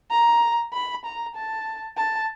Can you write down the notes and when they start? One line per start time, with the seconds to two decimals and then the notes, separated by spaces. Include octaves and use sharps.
0.11 A#5
0.73 B5
1.05 A#5
1.36 A5
1.97 A5